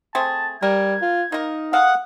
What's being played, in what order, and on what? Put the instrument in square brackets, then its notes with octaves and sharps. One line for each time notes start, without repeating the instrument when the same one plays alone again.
[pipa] A3 C4 G#4 [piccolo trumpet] A5
[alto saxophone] G3 [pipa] A#4 [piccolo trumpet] G#6
[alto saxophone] F4
[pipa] A#3 A#4 [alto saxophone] D#4
[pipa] G#3 A4 F5 [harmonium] F#5 [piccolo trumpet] D#6